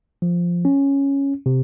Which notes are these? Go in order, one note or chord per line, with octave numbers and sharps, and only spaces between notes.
F3
C#4
C3